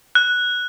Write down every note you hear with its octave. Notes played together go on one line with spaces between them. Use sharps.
F#6